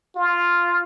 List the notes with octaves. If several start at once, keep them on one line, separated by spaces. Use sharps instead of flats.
F4